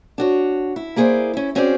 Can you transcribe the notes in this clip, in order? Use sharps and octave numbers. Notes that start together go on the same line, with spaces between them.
D4 F#4 C#5
E4
A#3 E4 G#4 A#4 C5 D5
C#4 E4
C4 C#4 F#4 G#4 C5 D5